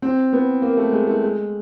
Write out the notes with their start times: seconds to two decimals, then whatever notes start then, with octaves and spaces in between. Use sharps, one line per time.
0.02 C4
0.33 B3
0.62 A#3
0.77 A3
0.93 G#3
1.07 A3
1.21 G#3